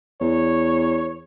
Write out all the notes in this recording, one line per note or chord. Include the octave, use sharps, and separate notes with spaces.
E2 C#5